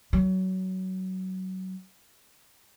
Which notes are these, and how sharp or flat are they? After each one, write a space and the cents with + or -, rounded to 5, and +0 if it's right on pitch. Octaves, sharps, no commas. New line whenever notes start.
F#3 +20